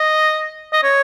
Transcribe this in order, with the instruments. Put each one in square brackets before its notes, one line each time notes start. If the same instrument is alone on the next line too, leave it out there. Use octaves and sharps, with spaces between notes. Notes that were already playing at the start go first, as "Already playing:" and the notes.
Already playing: [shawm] D#5
D#5
C#5